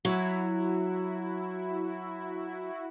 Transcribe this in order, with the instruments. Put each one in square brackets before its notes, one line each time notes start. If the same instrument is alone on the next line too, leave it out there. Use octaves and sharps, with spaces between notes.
[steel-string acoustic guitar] F#3 [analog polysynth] E4 F#4